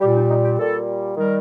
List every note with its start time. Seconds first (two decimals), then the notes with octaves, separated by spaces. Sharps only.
0.01 G3 G4
0.05 A#2
0.15 D#4
0.29 D#4
0.44 G4
0.59 A#2 G3 A4
1.17 D#3 G3 A#4